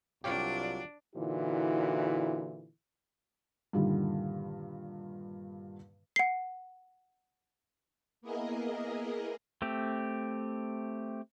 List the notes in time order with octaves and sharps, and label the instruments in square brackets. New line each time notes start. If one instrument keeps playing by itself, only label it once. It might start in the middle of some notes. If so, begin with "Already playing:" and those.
[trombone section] C2 F#3 F4 [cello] D4 [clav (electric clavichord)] G4 C#5 F5
[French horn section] A#2 D3 E3 D#4 E4 F#4
[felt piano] G2 A#2 D3 D#3 G3
[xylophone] F#5 C7
[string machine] A#3 B3 E4 G#4 A#4 D#5
[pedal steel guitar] A3 C4 G4